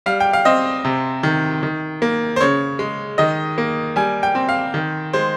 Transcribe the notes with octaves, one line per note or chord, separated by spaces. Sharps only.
G3 F5
G5
F5
C4 D#5
C3
D#3
D#3
A#3
C5
C#3 C#5
G#3
D#3 D#5
A#3
G3 G#5
G5
C4
F5
D#3
G#3 C5